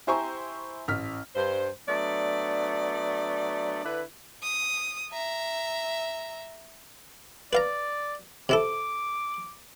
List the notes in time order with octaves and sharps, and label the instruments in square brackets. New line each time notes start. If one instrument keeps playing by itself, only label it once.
[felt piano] E4 G4 C5 G#5 A#5 C#6
A1 F6 B6
[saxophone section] G2 C5
F#3 A3 B3 D4 D5
D3 D4 E4 B4
[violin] D#6
E5 A#5
[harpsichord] B4 F5 A#5 [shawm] D5
[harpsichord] C3 E4 A4 [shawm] D6